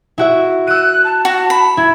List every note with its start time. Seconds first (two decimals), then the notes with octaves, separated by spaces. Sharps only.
0.18 E4 F#4 E5
0.67 E6 F#6 D#7
1.05 A5
1.25 F#4
1.50 B5
1.77 E4 G#6